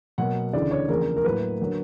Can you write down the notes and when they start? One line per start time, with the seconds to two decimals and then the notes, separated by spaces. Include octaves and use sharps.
0.18 B2 F#3 A#3 F#5
0.53 D2 C#3 E3 D5
0.71 C#5
0.89 E2 C#3 F3 A#3 A#4
1.16 A#4
1.24 A2 F#3 A#3 B4
1.59 D3 F#3 A#3